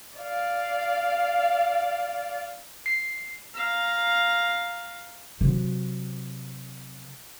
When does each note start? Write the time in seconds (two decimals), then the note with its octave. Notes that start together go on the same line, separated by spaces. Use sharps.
0.19 D5 F5
2.86 C7
3.55 F5 A#5
5.41 C3 F#3